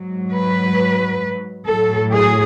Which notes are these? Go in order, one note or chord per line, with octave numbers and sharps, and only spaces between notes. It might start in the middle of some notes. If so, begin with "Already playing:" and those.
Already playing: G#2 F#3
B4
A2 F#3 A4
G#4